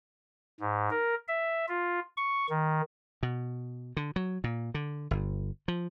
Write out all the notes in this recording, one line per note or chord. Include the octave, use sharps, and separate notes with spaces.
G#2
A#4
E5
F4
C#6
D#3
B2
D3
F#3
A#2
D3
G1
F3